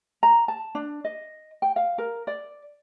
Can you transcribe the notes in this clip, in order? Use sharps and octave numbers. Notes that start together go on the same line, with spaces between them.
A#5
A5
D4
D#5
G5
F5
A#4
D5